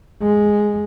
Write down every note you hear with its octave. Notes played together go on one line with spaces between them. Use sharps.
G#3